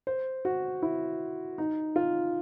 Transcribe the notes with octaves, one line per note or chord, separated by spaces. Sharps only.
C5
F#4
E4
D#4
F4